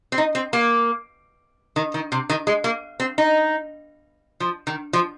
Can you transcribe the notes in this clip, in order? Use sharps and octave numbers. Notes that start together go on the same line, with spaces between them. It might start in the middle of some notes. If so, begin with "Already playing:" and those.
C4
D#4
C4
A#3
D#3
D#3
C3
D#3
G#3
A#3
C4
D#4
F3
D#3
F3